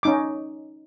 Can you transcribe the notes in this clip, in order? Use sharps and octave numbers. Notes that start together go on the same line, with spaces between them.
C#4 D#4 D6